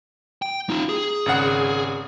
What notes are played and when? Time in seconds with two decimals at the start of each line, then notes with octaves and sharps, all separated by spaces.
0.42 G5
0.70 D#4 F4
0.89 G#4
1.26 G#1 C#3 F#5